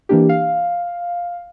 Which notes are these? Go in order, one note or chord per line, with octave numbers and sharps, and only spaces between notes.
E3 A#3 D4 G4
F5